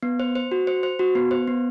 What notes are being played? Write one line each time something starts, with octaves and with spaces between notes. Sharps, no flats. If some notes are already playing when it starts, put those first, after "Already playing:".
B3
C5
C5
F#4
C5
C5
F#4
B3
C5
B3